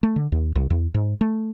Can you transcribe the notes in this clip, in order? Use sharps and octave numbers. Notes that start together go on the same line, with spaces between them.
A3
D3
D#2
C2
E2
G#2
A3